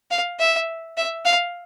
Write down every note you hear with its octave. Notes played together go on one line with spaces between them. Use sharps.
F5
E5
E5
F5